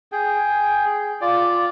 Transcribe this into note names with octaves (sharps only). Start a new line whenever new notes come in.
G#4 G5
F4 D5